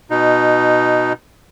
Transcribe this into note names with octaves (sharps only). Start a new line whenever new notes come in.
B2 D#4